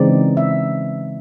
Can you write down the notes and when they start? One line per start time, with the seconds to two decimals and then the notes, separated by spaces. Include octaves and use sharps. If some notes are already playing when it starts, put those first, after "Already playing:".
Already playing: C#3 E3 G#3 C4 D#4 D5
0.37 E5